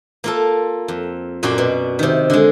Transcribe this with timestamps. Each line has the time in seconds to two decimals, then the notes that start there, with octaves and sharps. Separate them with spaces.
0.24 A#3 F4 A4
0.88 F2
1.43 F#2 A#2 F#4 D5 C6
1.58 B2
1.99 C3 D#3
2.30 D3 G#3